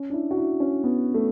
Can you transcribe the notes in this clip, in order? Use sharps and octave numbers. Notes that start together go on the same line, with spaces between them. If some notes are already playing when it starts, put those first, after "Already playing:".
Already playing: C#4
D4
E4
F#4
E4
C#4
B3
A3